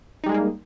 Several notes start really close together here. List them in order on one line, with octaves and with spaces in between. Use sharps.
D#4 G3 G#3 G#4 A#3